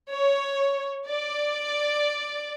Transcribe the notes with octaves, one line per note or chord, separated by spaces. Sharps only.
C#5
D5